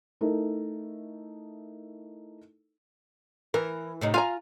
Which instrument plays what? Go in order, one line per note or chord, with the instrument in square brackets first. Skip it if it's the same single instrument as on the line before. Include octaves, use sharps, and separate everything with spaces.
[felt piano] A3 D#4 E4 A4 A#4
[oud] E3 [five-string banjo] A#4
[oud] A2 C3 D#4
[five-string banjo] F4 G#5 A#5 [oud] F5